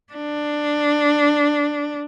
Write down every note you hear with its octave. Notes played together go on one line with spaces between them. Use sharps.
D4